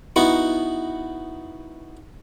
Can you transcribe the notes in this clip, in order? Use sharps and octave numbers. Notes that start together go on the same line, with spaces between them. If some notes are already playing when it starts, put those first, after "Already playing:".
B3 D#4 E4 F#4 F#5